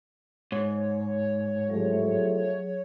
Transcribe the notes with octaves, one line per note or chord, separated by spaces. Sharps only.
G#2 C#5
C2 F3 F#3 A3 G#4